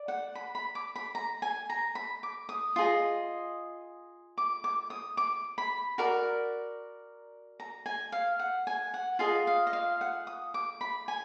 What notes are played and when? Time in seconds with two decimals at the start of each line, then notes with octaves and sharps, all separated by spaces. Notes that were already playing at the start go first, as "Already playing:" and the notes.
Already playing: D5
0.08 F#5
0.35 B5
0.55 B5
0.75 D6
0.96 B5
1.15 A#5
1.42 G#5
1.70 A#5
1.95 B5
2.23 D6
2.49 D#6
2.76 F4 G#4 D#5
4.38 D6
4.64 D6
4.90 D#6
5.17 D6
5.58 B5
5.98 F#4 A#4 D5
7.60 A#5
7.86 G#5
8.12 F5
8.39 F#5
8.67 G#5
8.94 F#5
9.19 F4 G#4 D#5 F5
9.47 F5
9.67 D#5
9.73 F5
10.01 F#5
10.27 D#6
10.54 D6
10.81 B5
11.08 G#5